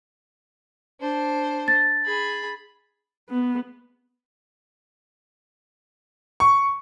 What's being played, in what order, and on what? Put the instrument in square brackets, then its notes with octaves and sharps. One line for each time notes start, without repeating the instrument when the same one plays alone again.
[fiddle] D4 C5
[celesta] A6
[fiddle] G#4 B5
[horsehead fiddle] B3
[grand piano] C#6